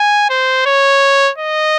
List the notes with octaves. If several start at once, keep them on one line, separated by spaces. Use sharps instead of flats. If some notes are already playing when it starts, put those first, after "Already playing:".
Already playing: G#5
C5
C#5
D#5